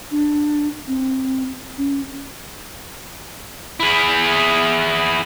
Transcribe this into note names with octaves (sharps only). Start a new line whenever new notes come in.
D4
C4
C#4
E4 G#4